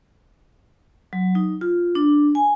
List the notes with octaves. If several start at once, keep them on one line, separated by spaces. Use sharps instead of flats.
F#3
D#4
F4
D4
G#5